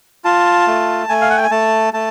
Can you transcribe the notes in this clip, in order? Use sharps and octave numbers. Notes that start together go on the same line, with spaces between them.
F4 A5
A3
A3 G#5
F5
F#5
G5
G#5
A3 A5
A3 A5